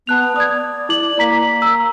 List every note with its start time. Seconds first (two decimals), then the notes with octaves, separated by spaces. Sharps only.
0.07 B3 A5 F#6 F7
0.36 D5 D#6 G#6
0.89 E4 D6 F#7
1.19 A#3 A#5 B6 F#7
1.62 A#5 E6